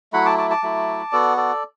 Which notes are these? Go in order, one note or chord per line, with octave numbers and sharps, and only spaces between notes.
F#3 A3 E4 F#5 B5
A5 D6
A5 D6
A5 D6
F#3 A3 E4
B3 F#4 A4 D5
A4 D5